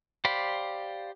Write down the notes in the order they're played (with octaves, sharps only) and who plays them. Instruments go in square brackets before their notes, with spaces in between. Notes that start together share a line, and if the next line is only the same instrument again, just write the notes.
[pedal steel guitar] G4 C5 D5 F5 B5